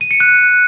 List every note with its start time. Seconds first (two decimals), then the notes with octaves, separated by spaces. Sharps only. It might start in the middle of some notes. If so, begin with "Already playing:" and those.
0.01 D#7
0.11 C#7
0.20 F#6